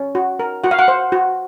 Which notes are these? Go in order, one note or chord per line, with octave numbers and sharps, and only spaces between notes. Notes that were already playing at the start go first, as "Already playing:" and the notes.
Already playing: C#4
F#4
A#4
F#4 F#5
F5
F#5
C5
F#4